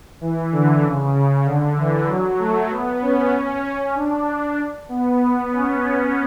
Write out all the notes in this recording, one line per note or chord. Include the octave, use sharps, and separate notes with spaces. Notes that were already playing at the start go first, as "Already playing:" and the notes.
E3
D3
C#3
C#3
D3
E3
F#3
A3
B3
C#4
D4
B3
B3
C#4